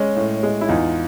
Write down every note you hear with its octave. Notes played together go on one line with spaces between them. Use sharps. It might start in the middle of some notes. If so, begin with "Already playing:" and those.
Already playing: G#3 C#4
A2
G#3
E4
E2 D#4 F4